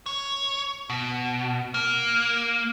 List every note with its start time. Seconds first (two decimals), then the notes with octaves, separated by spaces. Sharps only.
0.06 C#5
0.90 B2
1.74 A#3